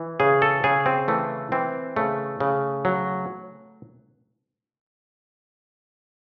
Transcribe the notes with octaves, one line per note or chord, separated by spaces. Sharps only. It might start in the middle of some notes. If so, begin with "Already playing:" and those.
Already playing: E3
C#3 G#4
A4
C#3 G#4
C4
E3 A3
E3 C4
C#3 A3
C#3
F#3